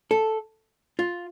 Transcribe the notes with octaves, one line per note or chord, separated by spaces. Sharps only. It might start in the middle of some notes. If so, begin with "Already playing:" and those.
A4
F4